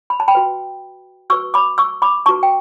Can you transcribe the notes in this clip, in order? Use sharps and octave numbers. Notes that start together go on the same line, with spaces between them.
B5
A5
G5 B5
F#4 B4
F#4 B4 C#6 E6
B5 D6
C#6 E6
B5 D6
D4 F#4 B4 A5 C#6
G5